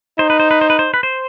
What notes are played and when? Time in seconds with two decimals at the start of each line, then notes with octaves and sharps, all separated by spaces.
0.18 D#4 C5
0.30 B4
0.40 C5
0.51 B4
0.61 C5
0.70 B4
0.79 C5
0.94 B4
1.03 C5